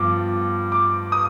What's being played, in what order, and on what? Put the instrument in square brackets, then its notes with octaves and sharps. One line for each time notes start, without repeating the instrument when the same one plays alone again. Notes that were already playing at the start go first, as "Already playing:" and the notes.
Already playing: [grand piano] G2 F3 B3 D6
D6
D#6